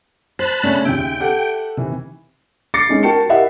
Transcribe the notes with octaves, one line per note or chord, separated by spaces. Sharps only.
C5 A5 B5 F#6
C#3 A3 C#4 D4
D#2 C#3 E5 G5
G4 A4 F#5
C3 D#3 E3
D6 A6 A#6 C7 C#7
G#3 C#4 D#4
F#4 A#4 G5 A5 C#7
E4 G4 A#4 D#5 E5 F#5